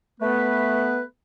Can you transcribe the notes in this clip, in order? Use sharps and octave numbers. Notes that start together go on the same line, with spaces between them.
A3 B3 B4